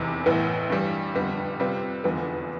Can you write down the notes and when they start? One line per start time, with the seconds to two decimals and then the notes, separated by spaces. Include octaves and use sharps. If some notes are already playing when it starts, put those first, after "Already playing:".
Already playing: F1 E2 C3 E3
0.26 A1 A2 E3 B3 E4
0.70 G2 E3 G3
1.15 F1 F2 D3 G3 B3
1.59 C3 G3 C4 F4 B4
2.04 F1 E2 D3 F3 B3